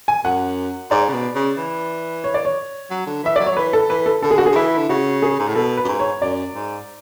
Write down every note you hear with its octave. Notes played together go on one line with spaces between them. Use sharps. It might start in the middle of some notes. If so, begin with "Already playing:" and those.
G#5
F#2 F#5
G#2 D5
C#3
B2
C#3
E3
C#5
D5
C#5
F#3
D3
E3 E5
F#3 D5
C#5
F#3
E3 B4
A4
E3 B4
A4
D3 A4
G#4
F#4
G#4
D3
E3 E4
D3
C#3 F#4
G#4
G#2
A2
B2 A4
B4
F#2
G#2
C#5
F#2 D5
G#2